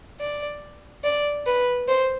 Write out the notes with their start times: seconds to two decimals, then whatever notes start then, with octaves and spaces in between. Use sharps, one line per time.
0.20 D5
1.04 D5
1.47 B4
1.88 C5